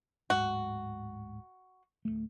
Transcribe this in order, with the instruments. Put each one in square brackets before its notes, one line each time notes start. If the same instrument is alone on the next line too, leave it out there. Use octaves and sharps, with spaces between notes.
[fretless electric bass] D1 G#2 [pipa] F#4
[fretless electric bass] D1 G#1 A3